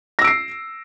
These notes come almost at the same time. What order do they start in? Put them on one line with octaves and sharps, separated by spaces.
A#6 E6 D7 C7